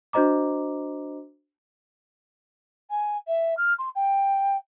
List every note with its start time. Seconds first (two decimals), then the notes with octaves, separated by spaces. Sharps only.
0.13 D4 F#4 C5 D#5 A#5 D6
2.90 G#5
3.27 E5
3.57 F6
3.79 C6
3.95 G5